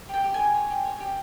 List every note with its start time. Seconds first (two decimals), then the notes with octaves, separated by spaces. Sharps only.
0.09 G4 G5
0.24 G4
0.34 G#5
0.39 G4
0.54 C#5
0.70 G4
0.85 C#5
1.00 G4